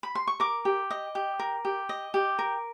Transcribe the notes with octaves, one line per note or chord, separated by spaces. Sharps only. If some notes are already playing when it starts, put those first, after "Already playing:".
B5
C6
C#6
A#4 D6
G4
D#5
G4
A#4
G4
D#5
G4
A#4